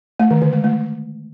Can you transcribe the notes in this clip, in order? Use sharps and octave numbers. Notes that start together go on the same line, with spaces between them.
A3
D#3
D3
G#3
A3